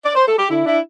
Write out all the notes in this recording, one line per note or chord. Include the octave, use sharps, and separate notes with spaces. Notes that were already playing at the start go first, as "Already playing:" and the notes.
D5
C5
A4
G4
D3 E4
D4 E4